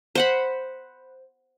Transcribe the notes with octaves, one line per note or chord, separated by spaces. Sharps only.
C5 F#5 B5